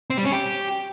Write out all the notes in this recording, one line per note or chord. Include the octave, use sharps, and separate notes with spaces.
C4
G3
C#4
G4